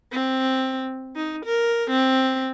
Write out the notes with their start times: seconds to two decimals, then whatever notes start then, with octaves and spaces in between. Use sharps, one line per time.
0.12 C4
1.16 D#4
1.45 A#4
1.90 C4